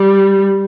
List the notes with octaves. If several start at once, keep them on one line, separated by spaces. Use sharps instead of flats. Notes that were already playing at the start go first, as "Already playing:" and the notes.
Already playing: G3